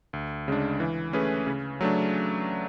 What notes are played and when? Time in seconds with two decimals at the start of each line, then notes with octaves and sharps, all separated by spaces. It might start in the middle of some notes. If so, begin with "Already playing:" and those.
0.13 D2
0.48 C#3 G#3 D4
0.80 E3
1.13 A3 C#4 G#4 B4
1.47 C#3
1.81 F#3 A3 D4